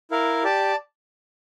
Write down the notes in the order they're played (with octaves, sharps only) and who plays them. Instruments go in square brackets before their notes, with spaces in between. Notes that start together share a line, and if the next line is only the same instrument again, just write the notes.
[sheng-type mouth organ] E4 A#4 F5
G4 D5 A5